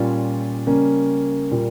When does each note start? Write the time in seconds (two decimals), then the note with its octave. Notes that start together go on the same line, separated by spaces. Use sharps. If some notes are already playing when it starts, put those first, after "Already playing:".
Already playing: A#2 G3 C#4 F4
0.67 C#3 G3 A#3 C#4
1.51 A#2 G3 A#3 F4